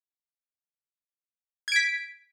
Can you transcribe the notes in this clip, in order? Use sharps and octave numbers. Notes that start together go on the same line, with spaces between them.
G#6 B6 D7